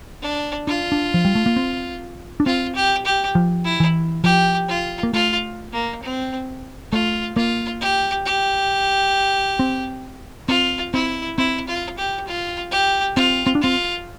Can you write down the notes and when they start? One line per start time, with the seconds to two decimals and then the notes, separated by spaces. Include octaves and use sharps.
0.22 D4
0.67 D4 F4
0.92 D4
1.14 F3
1.25 G3
1.35 A3
1.46 A#3
1.56 C4
2.40 D4
2.46 C4 F4
2.75 G4
3.05 G4
3.35 F3
3.64 E4
3.80 E3
4.24 F3 G4
4.68 F4
5.03 A#3
5.13 A3 F4
5.72 A#3
6.03 C4
6.92 A3 F4
7.36 A#3 F4
7.81 G4
8.26 G4
9.59 C4
10.48 C4 F4
10.93 C4 E4
11.38 C4 E4
11.67 F4
11.98 G4
12.27 F4
12.71 G4
13.16 C4 F4
13.47 C4
13.55 D4
13.62 C4 F4